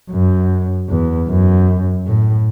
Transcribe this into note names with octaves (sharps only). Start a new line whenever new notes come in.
F#2
E2
F#2
A2